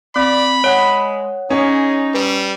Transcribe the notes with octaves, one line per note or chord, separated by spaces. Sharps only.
C4 D5 B5
G#3 C#5 F#5 F#6
C#4 D#4 G#4
G3 B4